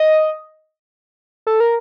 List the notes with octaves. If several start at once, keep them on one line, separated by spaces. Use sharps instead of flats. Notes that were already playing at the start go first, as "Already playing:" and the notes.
Already playing: D#5
A4
A#4